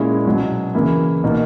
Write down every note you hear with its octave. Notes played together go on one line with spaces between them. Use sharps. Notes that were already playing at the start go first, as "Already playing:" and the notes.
Already playing: A#2 G#3 C#4 E4
B2 F#3 C#4
C#3 E3 A#3 E4
B2 A#3 D#4